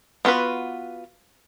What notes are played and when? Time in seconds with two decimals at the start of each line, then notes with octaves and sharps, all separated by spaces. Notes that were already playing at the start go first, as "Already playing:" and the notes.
0.25 B3 F4 F#4 B4